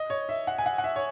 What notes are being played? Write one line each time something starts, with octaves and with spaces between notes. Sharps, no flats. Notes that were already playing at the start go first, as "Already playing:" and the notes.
Already playing: D#5
C#5
E5
F#5
G#5
F#5
F#5
E5
C#5